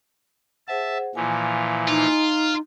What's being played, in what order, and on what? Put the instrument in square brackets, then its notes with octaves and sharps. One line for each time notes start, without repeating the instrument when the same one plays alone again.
[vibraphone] G#4 C5 F#5 [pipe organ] E5 A5
[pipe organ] A#2 E3 F3 [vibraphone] G#5
[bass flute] D#4 [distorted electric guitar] F4